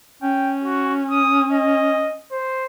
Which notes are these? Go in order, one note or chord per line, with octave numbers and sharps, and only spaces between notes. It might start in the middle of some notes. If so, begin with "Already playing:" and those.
C#4 G5
F#4
D#6
D#5
C5